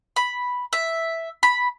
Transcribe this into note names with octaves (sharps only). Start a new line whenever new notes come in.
B5
E5
B5